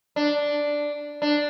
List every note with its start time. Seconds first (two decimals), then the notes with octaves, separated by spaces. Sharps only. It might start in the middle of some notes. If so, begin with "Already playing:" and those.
0.16 D4
1.22 D4